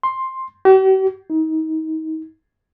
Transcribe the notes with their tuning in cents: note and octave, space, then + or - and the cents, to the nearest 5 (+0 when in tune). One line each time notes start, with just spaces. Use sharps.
C6 +10
G4 -45
D#4 +30